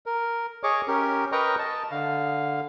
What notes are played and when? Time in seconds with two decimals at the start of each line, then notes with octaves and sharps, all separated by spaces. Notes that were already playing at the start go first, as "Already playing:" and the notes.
0.06 A#4
0.63 G#4 C#5 D#5 C#6 D6
0.88 C#4 G4 A#4
1.32 A#4 B4 D#5 G5 A#5 C#6
1.59 D#5 A5
1.91 D3 F5